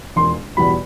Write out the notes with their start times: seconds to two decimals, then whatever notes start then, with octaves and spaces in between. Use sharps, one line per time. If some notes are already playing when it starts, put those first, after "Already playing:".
0.16 E1 C6
0.57 E2 B2 G3 B5